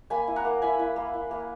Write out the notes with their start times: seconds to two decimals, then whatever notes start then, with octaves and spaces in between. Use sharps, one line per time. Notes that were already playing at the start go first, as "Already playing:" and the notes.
0.10 A#3 G#5 B5
0.28 E4
0.36 F#5 A#5
0.45 A#3
0.62 E4 G#5 B5
0.79 E4
0.96 A#3
1.14 E4
1.31 A#3